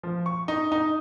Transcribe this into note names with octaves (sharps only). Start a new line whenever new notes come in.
F3
C#6
D#4
D#4